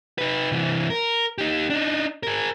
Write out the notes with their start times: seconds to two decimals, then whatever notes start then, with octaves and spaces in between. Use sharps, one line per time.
0.18 D#4 B4
0.52 C3 E3
0.90 A#4
1.38 D#4 G4
1.70 D4 D#4
2.23 G#4 A#4